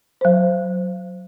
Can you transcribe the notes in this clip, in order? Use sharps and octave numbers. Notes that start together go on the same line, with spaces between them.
F#3 C5